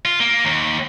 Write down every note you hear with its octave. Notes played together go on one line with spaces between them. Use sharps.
F4
A#3
D#2